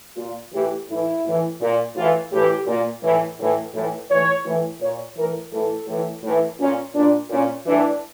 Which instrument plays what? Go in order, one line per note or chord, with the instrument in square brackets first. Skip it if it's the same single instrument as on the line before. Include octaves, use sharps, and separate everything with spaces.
[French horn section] A#2 F4
A2 E3 G4
A2 E3 E4
A2 E3
A#2
A2 E3 F4
A2 E3 G4
A#2
A2 E3
A2 E3
A2 E3
A2 E3 C#5
A2 E3
A#2 C#5
A2 E3 A#4
A2 E3 A4
A2 E3
A2 E3
A#2 C#4
A#2 D4
A#2 C#4
A2 E3 D4